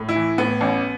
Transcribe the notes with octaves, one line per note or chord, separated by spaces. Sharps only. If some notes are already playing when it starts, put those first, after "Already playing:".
Already playing: A2
E4
E3
A2 B3
A1